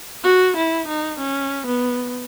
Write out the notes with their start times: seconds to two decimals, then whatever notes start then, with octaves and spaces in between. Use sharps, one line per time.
0.24 F#4
0.56 E4
0.88 D#4
1.19 C#4
1.67 B3